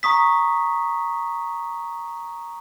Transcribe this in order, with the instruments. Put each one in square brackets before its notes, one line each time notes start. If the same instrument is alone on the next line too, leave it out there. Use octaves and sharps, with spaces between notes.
[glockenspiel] A#5 C#6 D#6 B6